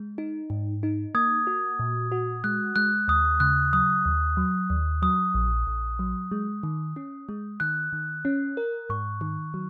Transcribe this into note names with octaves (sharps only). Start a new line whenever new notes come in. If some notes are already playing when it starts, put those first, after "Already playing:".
Already playing: G#3
D#4
G#2
D#4
A#3 D#6 G#6
F#4
A#2
F#4
G#3 F#6
G#3 F#6
D#2 D#6
C#3 F#6
F#3 D#6
D#2
F#3
D#2
F#3 D#6
A#1
A#1
F#3
G#3
D#3
C#4
G#3
D#3 F#6
D#3
C#4
A#4
G#2 C#6
D#3
F#3